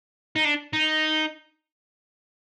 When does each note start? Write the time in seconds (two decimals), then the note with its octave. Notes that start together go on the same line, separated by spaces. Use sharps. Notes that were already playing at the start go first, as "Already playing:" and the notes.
0.36 D#4
0.45 D4
0.73 D#4